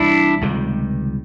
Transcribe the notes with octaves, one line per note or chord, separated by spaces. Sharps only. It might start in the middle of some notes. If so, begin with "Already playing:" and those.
Already playing: C2 C3 E3 G3 D4 E4
C#2 C3 D#3 G3